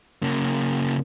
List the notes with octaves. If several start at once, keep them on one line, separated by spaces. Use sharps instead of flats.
C#3 A#3